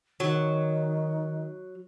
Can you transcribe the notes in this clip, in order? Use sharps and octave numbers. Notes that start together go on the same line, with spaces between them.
D#3 F#3